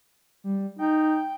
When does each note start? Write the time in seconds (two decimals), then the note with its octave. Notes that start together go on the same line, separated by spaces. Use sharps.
0.44 G3
0.79 D#4 G5